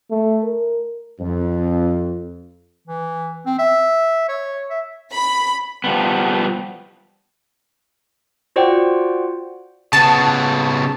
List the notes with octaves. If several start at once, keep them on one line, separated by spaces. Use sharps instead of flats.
A3
A#4
F2
E3
C4
E5
C#5
E5
B5
F3 G3 B3
F4 F#4 C5 D5 F#5 G5
C#3 B3 A5